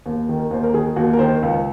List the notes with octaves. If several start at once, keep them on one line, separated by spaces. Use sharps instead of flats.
D#2
D#3
A#4
D#2 C5
A#4
D#3 G#4
D#2 F#4
A#4
D#3 C5
C#2